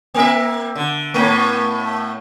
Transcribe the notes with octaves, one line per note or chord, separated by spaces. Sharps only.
A#3 A#4 E5
D3
A2 A3